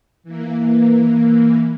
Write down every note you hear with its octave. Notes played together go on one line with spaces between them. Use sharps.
E3 A#3